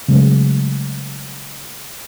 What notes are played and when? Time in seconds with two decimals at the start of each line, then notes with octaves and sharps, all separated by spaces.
0.08 C#3 F#3 G#3 A3